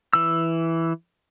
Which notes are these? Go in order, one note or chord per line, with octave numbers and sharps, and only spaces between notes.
E3 E6